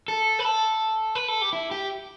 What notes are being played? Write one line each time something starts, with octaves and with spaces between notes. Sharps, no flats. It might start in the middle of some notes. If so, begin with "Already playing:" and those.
A4
B4
A4
B4
A4
G4
E4
G4